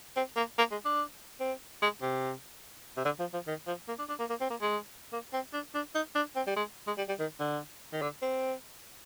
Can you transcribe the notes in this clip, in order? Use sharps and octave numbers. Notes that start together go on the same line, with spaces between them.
C4
A#3
A#3
G#3
D4
C4
G#3
C3
C3
D3
F3
F3
D#3
F3
A#3
D4
D4
A#3
A#3
C4
A#3
G#3
A#3
C4
D4
D4
D#4
D4
C4
G3
G#3
G#3
G3
G3
D#3
D3
D#3
D3
C4